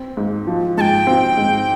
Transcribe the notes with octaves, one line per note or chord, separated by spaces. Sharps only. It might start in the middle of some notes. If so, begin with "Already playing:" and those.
Already playing: C4
G#2
F3
G#2 G5 A5
C4
G#2